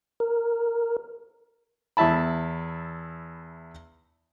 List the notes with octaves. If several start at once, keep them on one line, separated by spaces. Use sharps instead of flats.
A#4
E2 E4 E5 A5 B5